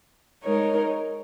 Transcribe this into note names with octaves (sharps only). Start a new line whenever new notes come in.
G#3 D#4 A#4 C#5